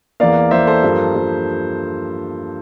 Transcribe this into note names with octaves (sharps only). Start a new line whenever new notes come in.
E2 E3 A#3 D5 F5
E2 E3 A#3 C5 E5
A4 C5
G2 F3 A#3
G2 F3 A#3